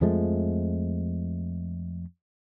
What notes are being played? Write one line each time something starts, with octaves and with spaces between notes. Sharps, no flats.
F2 F3 G#3 A3